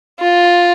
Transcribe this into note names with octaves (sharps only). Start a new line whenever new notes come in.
F4